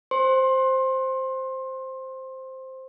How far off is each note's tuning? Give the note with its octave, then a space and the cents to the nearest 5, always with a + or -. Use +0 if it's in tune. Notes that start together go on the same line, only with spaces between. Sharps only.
C5 +0 C6 +25